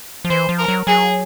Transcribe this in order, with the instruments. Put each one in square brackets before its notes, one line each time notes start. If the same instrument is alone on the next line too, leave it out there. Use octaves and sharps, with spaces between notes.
[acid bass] F3
[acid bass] E3 [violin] C5
[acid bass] F3
[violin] A#4
[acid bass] F#3
[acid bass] F#3 [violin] G#4